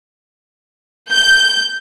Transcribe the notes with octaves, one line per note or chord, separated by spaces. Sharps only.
G6